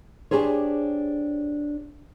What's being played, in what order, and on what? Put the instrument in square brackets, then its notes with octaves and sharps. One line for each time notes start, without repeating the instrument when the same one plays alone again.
[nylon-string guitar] D4 G4 G#4 C5 C#5